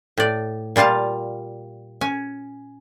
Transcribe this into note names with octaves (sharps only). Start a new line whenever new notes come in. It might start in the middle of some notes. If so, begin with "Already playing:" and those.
A2 D5
A#2 G3 F4 F5 A5
C#4 G#5